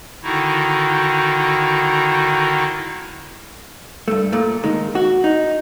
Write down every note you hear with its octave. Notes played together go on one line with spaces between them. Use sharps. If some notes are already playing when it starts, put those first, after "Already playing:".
D3 D#3 D#4 E4 F#4
G2 A3
A#2 A3
D#3 G#3
F#4
D#4